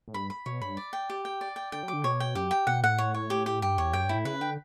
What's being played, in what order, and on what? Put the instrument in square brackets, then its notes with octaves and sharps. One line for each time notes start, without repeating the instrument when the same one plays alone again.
[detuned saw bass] A2
[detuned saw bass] G2 [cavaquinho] B5
[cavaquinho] B5
[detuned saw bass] B2 [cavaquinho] C#5
[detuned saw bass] G2 [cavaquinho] B5
[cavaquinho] D5
G5
G4
G5
D5
G5
[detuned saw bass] D3 [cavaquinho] G5
[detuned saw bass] F#3
[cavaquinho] D6
[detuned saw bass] D3
[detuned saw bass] B2 [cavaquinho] C#5
[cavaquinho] G5
[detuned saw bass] F#2 [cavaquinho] G4
[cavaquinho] G5
[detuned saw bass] B2 [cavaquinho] F#5
[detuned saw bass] A2 [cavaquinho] F#5
[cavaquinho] C#5
C#5
G4
G4
[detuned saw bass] G2 [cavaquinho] G4
[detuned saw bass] E2 [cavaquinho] C#5
[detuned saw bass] F#2 [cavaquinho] G5
[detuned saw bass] G2 [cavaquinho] E4
[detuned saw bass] A2
[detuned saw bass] C#3 [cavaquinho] B4
[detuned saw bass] D3 [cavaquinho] G5